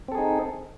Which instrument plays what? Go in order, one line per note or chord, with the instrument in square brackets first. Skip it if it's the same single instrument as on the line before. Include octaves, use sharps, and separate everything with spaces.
[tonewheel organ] C4
A4
G#4
D#4